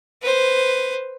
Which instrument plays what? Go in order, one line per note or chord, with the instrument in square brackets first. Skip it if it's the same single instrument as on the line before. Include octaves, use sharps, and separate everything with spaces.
[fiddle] B4 C5